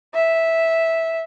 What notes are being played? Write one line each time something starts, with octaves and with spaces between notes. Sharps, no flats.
E5